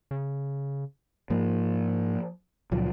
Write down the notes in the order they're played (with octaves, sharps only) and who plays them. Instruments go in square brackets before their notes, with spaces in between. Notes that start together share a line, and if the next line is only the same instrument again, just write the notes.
[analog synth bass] C#3
[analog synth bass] G#2 [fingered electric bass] F3 A#3
[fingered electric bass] C#2 F3 F#3 [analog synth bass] A#2